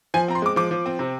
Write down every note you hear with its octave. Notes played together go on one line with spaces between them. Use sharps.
F3 G#5
C4 A#5
C6
G#3 D6
F3 D6
F3
C4
C3